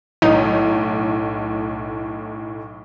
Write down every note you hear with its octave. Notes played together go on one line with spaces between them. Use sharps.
B1 A2 D#4 D#7